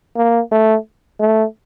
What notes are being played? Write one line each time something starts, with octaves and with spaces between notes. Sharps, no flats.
A#3
A3
A3